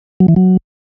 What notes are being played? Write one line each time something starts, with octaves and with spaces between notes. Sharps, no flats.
F#3
E3
F#3